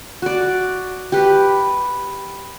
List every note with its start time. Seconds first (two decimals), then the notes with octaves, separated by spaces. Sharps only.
0.22 F#4 D5
1.12 G4 B4